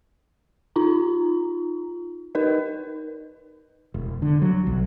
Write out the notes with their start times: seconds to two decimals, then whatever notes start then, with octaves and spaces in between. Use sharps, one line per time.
0.76 D#4 F4 A#5
2.35 D#4 A#4 B4 D#5
3.94 E1
4.22 D3
4.42 F#3
4.67 B1